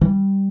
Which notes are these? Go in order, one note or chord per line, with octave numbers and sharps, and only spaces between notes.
E3 G3